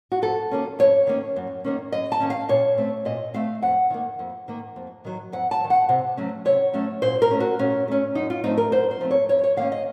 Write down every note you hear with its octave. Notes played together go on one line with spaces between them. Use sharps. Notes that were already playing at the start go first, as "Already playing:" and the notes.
F#4
F2 A4
D#3 A#3 C#4
F2 C#5
D#3 A#3 C#4
F#2
D#3 A#3 C#4
F#2 D#5
A5
D#3 A#3 C#4
F5
A#2 C#5
A3 C4
A#2 D#5
A3 C4 F5
F2 F#5
D#3 A#3
F2
D#3 A#3
F2
D#3 F#3
F2 F#5
A5
F#3
D#3
F#5
C3
F#3 A3 C#4
C3 C#5
F#3 A3 C#4
A#2 C5
A#4
A3 C#4
F#4
A#2 C#4
A3 C#4
F#2 D#4
F4
F3 A3 C4 D#4
A#4
F#2 C5
C5
F3 A3 C4
C#5
F2 C#5
C#5
D#3 A#3 C#4 F5
D#5